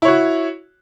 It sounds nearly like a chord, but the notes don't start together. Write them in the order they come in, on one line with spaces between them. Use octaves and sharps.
E4 C#5 F#4